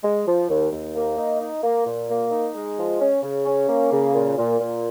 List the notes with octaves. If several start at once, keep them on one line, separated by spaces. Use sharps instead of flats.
G#3
F3
D#2
D#2
A#3
D#4
D#4
A#3
A#2
A#3
D#4
G#3
F3
C#4
C#3
C#4
A#3
C#3
A#2
A#2
A#2